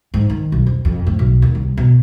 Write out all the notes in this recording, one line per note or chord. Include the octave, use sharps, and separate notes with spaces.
G#2
D#3
B1
F2
F2
A2
B1
D#2
C2
B2